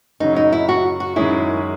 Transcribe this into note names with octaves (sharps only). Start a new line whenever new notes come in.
F#2 C#3 F#3 C#4 D#4
D#4
E4
F#4
F#4
F#2 D#3 G#3 C#4 E4 G#4